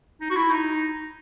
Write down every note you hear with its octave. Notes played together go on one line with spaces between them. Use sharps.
D#4
F#4
E4
D#4